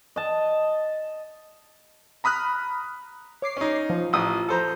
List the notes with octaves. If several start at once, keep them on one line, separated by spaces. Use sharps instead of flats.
D#5 A5
A#5 B5 D#6 F6 F#6
C#5 D6 C7
C#4 D#4
F3
A1 D#6 E6
A4 C5 A#5